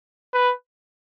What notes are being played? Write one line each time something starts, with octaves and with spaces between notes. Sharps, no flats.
B4